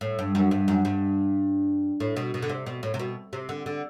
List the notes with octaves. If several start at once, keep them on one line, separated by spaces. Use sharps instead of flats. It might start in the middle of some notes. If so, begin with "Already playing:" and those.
A2
G2
F#2
G2
F#2
G2
A2
B2
B2
D3
C3
B2
A2
C3
B2
C3
D3
D3